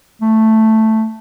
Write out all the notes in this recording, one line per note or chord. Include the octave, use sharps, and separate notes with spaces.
A3